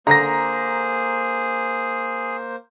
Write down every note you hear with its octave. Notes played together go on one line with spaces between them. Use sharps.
D3 A#3 G#4 C5 A#5 A#6